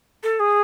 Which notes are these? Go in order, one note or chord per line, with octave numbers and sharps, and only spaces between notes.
A4
G#4